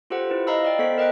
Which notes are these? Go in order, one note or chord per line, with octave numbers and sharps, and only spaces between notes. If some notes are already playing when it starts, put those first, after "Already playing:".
F4 G4 A4 C5 F#5
E4 B4
D#5 F5 A#5 B5 E6
D5 F5 G5
B3 A4 C5 F#5 B6
A#4 D#5 G5 F#6